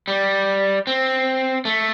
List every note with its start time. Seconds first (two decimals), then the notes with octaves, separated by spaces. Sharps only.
0.08 G3
0.87 C4
1.65 A3